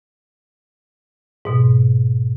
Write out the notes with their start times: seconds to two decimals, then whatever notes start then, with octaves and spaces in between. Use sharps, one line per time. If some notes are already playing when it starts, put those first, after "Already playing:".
1.45 G#2 B2